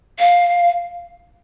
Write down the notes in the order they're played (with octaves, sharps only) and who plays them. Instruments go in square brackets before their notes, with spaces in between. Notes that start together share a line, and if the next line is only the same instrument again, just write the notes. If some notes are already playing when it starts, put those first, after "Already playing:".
[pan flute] F5